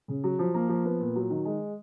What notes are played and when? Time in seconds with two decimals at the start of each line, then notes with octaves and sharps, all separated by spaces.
0.08 C#3
0.24 F#3
0.39 F3
0.54 A#3
0.69 F3
0.85 B3
1.00 A#2
1.15 F#3
1.30 D#3
1.45 G#3